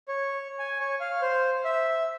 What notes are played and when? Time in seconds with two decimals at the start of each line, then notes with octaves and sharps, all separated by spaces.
0.08 C#5
0.59 G#5
0.80 C#5
1.00 F5
1.21 C5
1.65 E5